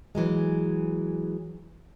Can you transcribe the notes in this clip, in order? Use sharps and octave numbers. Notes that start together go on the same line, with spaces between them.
E3 F#3 G#3